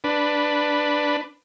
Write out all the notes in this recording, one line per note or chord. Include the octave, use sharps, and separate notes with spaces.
D4 B4